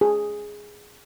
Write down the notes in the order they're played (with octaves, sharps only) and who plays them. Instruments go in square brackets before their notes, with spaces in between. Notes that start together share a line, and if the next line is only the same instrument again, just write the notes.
[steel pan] G#4